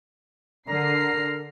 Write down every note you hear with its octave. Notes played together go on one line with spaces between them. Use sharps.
D3 A#4 A#5 C7